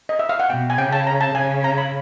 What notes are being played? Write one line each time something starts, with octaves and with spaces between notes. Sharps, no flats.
D#5
E5
F5
F#5
B2 G5
G#5
C#3 G5
A5
A#5
A5
C#3 G#5
A#5
B5